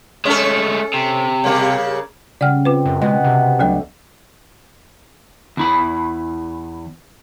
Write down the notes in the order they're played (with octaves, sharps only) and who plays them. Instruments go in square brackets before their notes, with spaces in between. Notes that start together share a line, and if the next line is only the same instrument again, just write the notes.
[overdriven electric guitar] G#3 A3 [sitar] C#4 A4
[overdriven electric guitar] C3
[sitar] C#3 G3 A#3
[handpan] C#3 [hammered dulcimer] G3 [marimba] D5 F#5 F6
[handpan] C4 [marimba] F4 B4
[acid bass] F#2
[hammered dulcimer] B2 F#5 [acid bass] G#3
[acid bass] C3
[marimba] D2 F#3 D5 [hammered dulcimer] D3 G3 A3
[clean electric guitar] E2 E4 B5